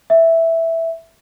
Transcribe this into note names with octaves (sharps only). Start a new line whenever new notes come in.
E5